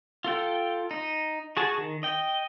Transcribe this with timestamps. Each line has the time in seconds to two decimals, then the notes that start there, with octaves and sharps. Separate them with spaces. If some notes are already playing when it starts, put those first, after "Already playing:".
0.24 F4 A4 G5
0.91 D#4
1.57 F#4 G#4 A5
1.78 D#3
2.03 D#5 G5